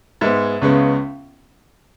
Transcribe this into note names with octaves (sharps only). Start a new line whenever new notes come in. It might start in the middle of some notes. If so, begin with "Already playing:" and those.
G#2 G#3 B3 E5
C#2 C#3 G#3 B3